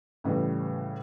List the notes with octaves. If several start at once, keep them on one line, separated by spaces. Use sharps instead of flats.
A2 C#3 E3 G3